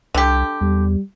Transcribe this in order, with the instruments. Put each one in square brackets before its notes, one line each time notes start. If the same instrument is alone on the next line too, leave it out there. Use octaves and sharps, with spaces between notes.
[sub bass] C2 [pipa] D3 G4
[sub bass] E2 [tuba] G3